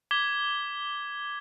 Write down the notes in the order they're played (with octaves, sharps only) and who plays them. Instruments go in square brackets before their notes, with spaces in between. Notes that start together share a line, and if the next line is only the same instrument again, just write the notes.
[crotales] D6 G#6 B6 G7